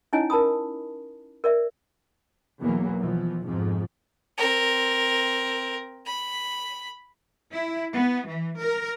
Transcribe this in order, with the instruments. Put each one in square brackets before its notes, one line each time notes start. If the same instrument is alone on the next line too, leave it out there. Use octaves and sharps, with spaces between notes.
[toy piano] C#4 D#4 E4 C#5 D#5 G#5
A#4 A5 B5 D#6
A#4 D5 E5
[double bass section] B1 E2 E3 F#3 A#3
B2 E3 F3
F2 G#2 B2 F3
[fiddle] C4 A#4
B5
[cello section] E4
B3
E3
A#4